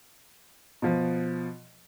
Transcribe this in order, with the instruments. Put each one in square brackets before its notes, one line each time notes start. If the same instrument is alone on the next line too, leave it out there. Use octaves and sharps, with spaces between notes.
[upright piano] B2 F3